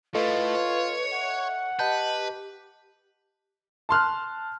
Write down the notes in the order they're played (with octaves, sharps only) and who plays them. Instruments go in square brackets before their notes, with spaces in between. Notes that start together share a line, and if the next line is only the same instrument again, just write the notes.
[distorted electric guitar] A2 A3 [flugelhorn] F4 [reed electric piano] A4 D#5 [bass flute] B4
[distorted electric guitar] C#5
[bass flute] E5 [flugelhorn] F#5
[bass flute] G4 [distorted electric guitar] B4 [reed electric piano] D#5 A5 G6
[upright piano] A5 C6 F6 F#6